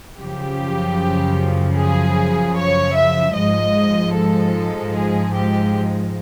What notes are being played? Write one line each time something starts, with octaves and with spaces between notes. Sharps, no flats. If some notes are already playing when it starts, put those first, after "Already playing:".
F#2 C#3 F3 G4
G#4
C#5
E5
G#2 F3 G#3 D#5
A4
G#4
G4